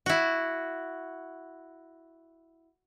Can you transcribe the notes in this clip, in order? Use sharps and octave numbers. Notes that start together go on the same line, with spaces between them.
E4 F#4